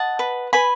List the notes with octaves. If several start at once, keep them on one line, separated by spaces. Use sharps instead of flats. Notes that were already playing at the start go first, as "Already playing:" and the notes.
Already playing: D#5 F#5 A5
B4
B4 G#5 B5